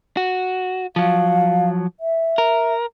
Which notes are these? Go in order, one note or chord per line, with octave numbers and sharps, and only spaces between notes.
F#4
F3 F#3 F5
E5
A#4